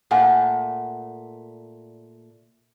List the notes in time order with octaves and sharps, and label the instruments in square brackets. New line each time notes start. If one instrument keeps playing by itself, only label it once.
[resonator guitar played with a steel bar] A#2 A3 F#5 G#5